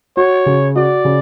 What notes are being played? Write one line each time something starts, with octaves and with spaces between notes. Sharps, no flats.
F#4 C#5
C#3
F#4 D5
C#3